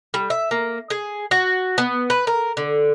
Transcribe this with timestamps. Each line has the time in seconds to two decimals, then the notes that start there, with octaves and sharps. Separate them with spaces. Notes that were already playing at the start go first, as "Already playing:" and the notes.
0.14 G3
0.30 E5
0.51 A#3
0.90 G#4
1.31 F#4
1.78 B3
2.10 B4
2.27 A#4
2.57 D3